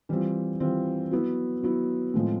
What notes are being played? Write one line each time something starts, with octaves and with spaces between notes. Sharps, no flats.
E3 G3 C4 F4
E3 G3 C4 F4
F#3 B3 E4
F#3 B3 E4
A2 F3 G#3 C4